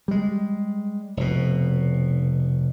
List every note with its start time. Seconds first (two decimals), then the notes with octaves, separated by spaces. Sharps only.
0.08 G3 G#3
1.17 F1 B2